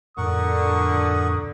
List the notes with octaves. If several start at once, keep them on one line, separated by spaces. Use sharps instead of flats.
F2 A2 D3 A#4 F#5 C#6 D#6